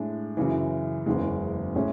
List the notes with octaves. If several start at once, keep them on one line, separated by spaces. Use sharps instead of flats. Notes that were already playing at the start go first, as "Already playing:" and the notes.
Already playing: A2 G#3 D4
F#2 C#3 E3
F#1 E2 C#3 G#3
A2 G#3 C#4